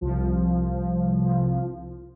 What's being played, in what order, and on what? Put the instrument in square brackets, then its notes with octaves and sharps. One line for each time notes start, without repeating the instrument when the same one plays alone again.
[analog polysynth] C2 F3